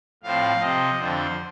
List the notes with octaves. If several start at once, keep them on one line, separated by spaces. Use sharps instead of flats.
A2 F3 C4 F5
C3 F3 C4 D#5
F2 D3 F3 C4 C5